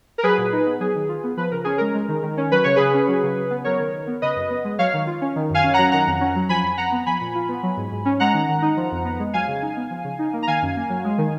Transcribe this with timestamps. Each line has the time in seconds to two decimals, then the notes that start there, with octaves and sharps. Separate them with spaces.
0.18 A#4
0.23 F#3 G#4 B4
0.38 A#2
0.52 D#4
0.66 B3
0.80 F#3 G#4
0.95 D#3
1.09 F4
1.24 B3
1.37 F3 B4
1.51 C#3 A#4
1.64 C#4 G#4
1.78 G#3 A#4
1.94 G#3
2.09 D#3
2.23 D#3
2.37 C#4
2.51 F#3 B4
2.64 C#3 C#5
2.76 C#3 G#4 B4
2.94 C#4
3.08 F#3
3.23 C#3
3.37 C#3
3.51 B3
3.64 F#3 A#4 C#5
3.79 D#3
3.94 D#3
4.07 B3
4.22 C#3 B4 D#5
4.36 F#2
4.50 B3
4.64 G#3
4.79 F#3 C#5 F5
4.93 D#3
5.07 F4
5.21 C#4
5.36 D#3
5.50 F#2 F5 G#5
5.64 C#4
5.73 F#3 F#5 A#5
5.92 D#3 F#5 A#5
6.07 F2
6.21 C#4
6.35 F#3
6.49 F3 G#5 B5
6.63 F2
6.77 F2 F#5 A#5
6.92 B3
7.06 F3 G#5 B5
7.21 A#2
7.35 F4
7.49 B3
7.63 F#3
7.77 G#2
7.92 G#2
8.05 C#4
8.20 G#3 F#5 A#5
8.34 D#3
8.48 D#3
8.62 D#4
8.77 F3
8.92 F2
9.05 B3
9.19 G#3
9.33 F#3 F5 G#5
9.48 C#3
9.62 D#4
9.77 B3
9.90 F3
10.04 C#3
10.19 D#4
10.33 A#3
10.43 A#5
10.47 D#3 F5 G#5
10.62 F#2
10.76 A#3
10.89 F#3
11.04 G#3
11.18 D#3